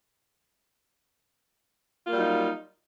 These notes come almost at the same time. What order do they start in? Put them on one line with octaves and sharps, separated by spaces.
F4 A#3 G3 F#3 D#4